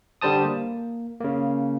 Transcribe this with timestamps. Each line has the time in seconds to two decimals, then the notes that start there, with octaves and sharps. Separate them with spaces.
0.21 D3 G3 C5 A5 D#6
0.44 A#3
1.20 C#3 A#3